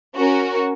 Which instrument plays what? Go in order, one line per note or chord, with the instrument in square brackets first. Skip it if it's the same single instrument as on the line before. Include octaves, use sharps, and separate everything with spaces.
[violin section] C#4 F#4 A#4